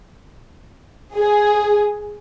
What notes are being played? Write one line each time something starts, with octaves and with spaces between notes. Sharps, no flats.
G#4